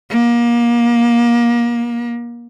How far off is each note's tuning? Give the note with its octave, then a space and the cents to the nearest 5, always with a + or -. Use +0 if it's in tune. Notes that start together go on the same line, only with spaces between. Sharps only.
A#3 +30